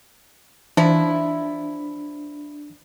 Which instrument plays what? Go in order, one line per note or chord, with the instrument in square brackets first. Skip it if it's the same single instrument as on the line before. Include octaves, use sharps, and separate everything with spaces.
[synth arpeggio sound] E3 [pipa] F3 E4 [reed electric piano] D4